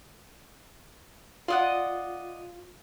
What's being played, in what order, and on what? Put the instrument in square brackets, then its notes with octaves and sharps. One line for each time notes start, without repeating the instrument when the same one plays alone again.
[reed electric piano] F4 [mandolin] D5 D#5 F#5